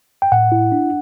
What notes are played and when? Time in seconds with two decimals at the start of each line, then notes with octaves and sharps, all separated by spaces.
0.22 G5
0.32 A2 F#5
0.52 E4
0.72 D4